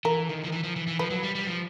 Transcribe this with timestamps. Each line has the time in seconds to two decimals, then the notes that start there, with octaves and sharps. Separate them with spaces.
0.05 E3 A#4
0.29 D#3
0.44 F3
0.52 E3
0.64 F3
0.76 E3
0.88 E3
0.99 F3 B4
1.10 F#3
1.23 G3
1.35 G3
1.47 F3